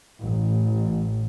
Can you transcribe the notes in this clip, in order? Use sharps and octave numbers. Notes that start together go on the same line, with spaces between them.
A1